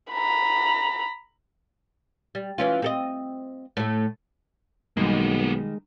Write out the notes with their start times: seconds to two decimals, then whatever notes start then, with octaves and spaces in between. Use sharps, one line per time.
0.12 A#5 B5
2.35 G3
2.58 E3 C#4 F4
2.82 C4 A4 D#5
3.77 A2 A3
4.97 B1 D#3 G3 G#3 A#3 B3